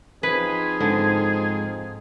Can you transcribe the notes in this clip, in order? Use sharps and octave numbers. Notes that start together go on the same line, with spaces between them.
F3 C4 D#4 G#4 B4
G#2 D3